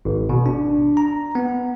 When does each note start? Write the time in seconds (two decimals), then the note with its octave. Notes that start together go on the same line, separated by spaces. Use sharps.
0.05 G#1
0.29 B2
0.46 D4
0.97 A#5
1.35 B3